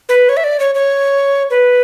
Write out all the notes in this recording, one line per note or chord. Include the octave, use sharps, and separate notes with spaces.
B4
C#5
E5
D5
C#5
C#5
B4